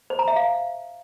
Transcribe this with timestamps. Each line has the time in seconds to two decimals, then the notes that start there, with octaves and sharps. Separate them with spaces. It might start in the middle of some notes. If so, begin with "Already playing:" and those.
0.10 C5
0.19 A#5
0.28 E5
0.36 F5